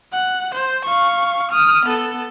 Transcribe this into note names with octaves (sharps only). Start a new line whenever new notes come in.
F#5
C5
F5 C#6
D#6 F6
B3 A4